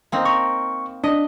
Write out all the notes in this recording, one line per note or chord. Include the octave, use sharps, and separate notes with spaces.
A#3 C4 D#4
A#4 C#6
D4 D#5